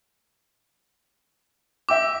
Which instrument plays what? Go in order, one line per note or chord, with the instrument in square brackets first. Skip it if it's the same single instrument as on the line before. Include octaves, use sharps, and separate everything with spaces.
[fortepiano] E5 G5 E6 [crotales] D6